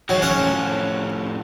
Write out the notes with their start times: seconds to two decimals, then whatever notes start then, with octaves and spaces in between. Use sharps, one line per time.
0.09 F#3 D#4 F#4 G#4
0.22 C#4 F#5
0.39 A2 F3